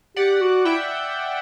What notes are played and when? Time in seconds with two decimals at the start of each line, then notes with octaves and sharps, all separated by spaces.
0.16 G4 D5 F#5
0.41 F#4
0.65 E4 E5 G5